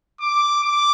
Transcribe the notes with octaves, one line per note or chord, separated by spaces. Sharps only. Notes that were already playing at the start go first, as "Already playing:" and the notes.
D6
D6